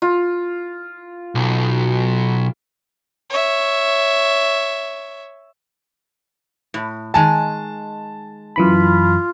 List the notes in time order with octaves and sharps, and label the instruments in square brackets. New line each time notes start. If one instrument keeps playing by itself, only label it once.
[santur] F4
[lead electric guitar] B1
[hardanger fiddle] C#5 E5
[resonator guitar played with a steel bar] A2
[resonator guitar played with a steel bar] D#3 G#3 G#5 [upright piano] A5
[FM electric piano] F#2 E3 B5 [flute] F4